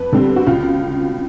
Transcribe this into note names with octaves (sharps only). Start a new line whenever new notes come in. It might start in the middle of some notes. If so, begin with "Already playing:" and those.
Already playing: F2 B4
D3 G3 C4
F#4
C#2 F4